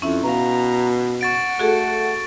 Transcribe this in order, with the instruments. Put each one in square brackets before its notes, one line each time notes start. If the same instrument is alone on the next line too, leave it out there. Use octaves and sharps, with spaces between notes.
[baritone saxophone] F2 [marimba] C#4 E4 E5
[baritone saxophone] B2 [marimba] B4 F5 [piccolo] A#5
[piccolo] F#5 [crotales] C#6 A6 D7
[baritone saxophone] A3 [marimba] F#4 G#4 A4